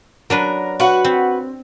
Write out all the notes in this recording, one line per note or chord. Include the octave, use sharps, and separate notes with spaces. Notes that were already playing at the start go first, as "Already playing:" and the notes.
F#3 D4 A#4 B4
F#4 B4 F#5
C4